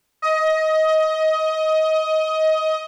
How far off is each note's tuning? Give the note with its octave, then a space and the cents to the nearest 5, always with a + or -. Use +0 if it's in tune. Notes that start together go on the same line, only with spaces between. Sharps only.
D#5 +20